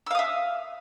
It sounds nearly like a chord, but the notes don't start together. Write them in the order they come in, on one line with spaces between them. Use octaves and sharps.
E6 F5 D#6 E5